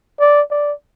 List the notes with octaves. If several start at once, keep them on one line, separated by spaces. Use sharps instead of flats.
D5
D5